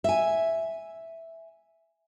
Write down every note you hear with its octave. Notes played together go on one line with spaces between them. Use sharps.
E5 G#5